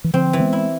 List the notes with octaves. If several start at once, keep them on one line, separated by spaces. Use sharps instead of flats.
E3
D3 F3 C4
E3
G#3 B3
E4